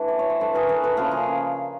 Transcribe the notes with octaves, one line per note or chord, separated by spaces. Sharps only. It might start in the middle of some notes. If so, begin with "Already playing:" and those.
Already playing: E3 A3 D4
D5
C#5
C5
E3 A3 D4 A4 B4
G#4 A#4
A4 B4
A4 B4
C#3 F3 A#3 G#4 A#4
G#4 A#4